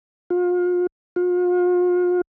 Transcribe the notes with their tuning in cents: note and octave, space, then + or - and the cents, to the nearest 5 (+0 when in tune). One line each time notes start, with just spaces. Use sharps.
F4 +35
F4 +40